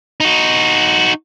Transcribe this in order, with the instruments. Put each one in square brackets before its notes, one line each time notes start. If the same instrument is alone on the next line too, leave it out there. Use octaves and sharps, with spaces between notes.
[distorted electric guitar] D#4 F#4